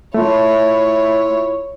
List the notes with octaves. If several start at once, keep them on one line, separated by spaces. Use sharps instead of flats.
A3 E4 F4 C#5